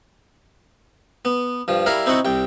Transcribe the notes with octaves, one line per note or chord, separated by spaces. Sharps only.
B3
G2 F3
G3 E4 A#4 E5 F5
C4 D#4 E4 F#4 F#5
C2 C3 G5